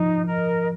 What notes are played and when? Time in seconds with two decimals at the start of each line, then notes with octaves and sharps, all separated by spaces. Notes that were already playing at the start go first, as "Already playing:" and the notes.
Already playing: F3 D#4
0.25 A#4 D#5